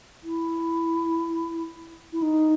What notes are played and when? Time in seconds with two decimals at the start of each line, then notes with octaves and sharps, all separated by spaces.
0.24 E4
2.13 E4
2.22 D#4